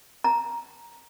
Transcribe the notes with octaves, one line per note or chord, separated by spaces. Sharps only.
A#5